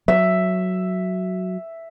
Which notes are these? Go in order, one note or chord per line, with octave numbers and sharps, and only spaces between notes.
F#3 E5